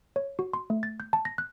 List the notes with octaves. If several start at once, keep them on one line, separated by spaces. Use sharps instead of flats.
C#5
F#4
C6
A3
A6
G6
A5
A#6
F#6